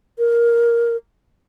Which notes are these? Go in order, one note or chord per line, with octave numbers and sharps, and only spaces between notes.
A#4